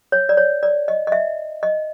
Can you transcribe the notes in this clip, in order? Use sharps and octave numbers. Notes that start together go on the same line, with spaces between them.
C#5
D5
C#5
D5
D#5
D#5
E5
D#5